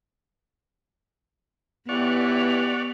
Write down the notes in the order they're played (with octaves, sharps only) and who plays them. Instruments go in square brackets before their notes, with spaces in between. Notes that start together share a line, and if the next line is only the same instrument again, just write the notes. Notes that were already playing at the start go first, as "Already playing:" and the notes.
[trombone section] B1 E3 G4 [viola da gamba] B3 [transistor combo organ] D5 F#5 C#6 [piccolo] F7